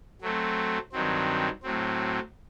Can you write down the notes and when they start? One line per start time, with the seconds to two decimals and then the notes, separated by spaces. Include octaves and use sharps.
0.21 F#3 A3 C4
0.92 G2 D#3 F#3 C4
1.63 A2 F#3 C4